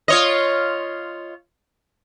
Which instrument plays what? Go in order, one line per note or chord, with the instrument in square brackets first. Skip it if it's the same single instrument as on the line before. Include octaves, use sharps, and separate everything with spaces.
[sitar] F4 C#5 D#5